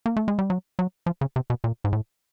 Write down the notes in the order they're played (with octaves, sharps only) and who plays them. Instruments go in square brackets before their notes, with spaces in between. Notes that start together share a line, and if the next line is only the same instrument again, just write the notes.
[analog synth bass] A#3
A3
G#3
G3
F#3
F#3
F3
C#3
C3
B2
A#2
G#2
A2